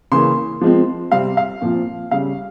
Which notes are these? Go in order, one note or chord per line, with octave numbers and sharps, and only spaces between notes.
C#3 E3 A#3 C#4 C6
F3 G#3 C4
C3 G3 C4 F5
F5
A#2 F3 C4
C#3 G3 C#4 F5